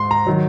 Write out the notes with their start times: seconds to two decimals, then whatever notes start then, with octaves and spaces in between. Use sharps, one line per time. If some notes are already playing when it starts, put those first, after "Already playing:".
Already playing: G#2 C6
0.11 A#5
0.26 D#3 F#3